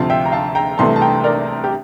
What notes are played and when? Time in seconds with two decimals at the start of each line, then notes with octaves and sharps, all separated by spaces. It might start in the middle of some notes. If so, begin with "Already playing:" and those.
Already playing: D2 C3 F3 C4 F5 A5
0.10 E5 G5
0.25 A#5
0.32 F5 A5
0.55 G5 A#5
0.78 C2 C3 E3 A3 A5 C6
0.96 A5
1.01 G5 A#5
1.24 A#4 D5
1.64 G4